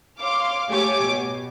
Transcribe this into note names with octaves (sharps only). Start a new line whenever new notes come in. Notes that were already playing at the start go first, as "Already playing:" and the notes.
C#5 F5 C6 D6 F6
A3 G4 C#5 G#5 D6
B2